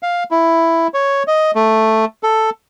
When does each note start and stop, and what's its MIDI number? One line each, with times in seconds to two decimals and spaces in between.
0.03 0.24 77
0.31 0.87 64
0.94 1.23 73
1.28 1.51 75
1.55 2.05 57
2.23 2.50 69